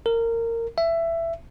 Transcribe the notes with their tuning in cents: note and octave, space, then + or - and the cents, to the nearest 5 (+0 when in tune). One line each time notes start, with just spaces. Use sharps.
A#4 -20
E5 +15